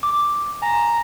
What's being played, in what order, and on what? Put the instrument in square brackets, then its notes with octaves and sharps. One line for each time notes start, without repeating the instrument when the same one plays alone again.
[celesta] D6
[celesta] G#5 [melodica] A#5